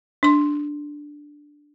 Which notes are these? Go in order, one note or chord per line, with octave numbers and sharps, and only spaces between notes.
D4 C6